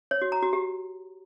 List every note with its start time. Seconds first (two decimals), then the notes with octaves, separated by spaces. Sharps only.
0.11 C#5
0.22 F#4
0.32 A#5
0.42 F#4
0.53 G4